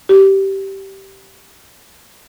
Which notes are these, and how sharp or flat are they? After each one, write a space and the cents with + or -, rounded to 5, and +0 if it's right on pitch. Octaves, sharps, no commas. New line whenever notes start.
G4 -15